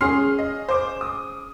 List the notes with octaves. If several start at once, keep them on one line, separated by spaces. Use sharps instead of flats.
C#4 G#4 C6 F6 C7
D#5
C5 D6
D#6